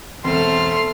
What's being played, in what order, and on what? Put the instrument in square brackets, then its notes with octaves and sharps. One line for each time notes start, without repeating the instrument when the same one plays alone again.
[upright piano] E1 C4 [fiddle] A3 F6 [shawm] C6